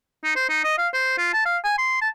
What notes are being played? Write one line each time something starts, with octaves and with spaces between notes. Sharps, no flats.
D#4
C5
D#4
D#5
F5
C5
F4
A5
F5
G#5
C6
A5